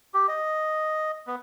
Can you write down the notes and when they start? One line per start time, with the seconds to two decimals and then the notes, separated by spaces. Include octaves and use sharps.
0.14 G4
0.28 D#5
1.27 B3